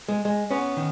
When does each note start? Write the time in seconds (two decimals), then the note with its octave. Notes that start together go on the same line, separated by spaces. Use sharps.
0.09 G#3
0.25 G#3
0.51 B3 C#4
0.77 D#3